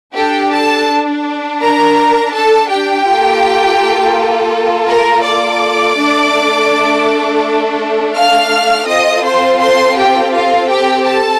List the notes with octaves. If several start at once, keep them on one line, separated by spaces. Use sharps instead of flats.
D4 G4 A4 G5
A4 A5
A#4 A#5
A4 A5
G4 G5
A#3 F4 A4
A#4 A#5
D5 D6
A3 D4 A4
F5 F6
C4 F4 A4 D#5 D#6
C5 C6
C5 C6
G4 G5
F4 F5
G4 G5
A4 A5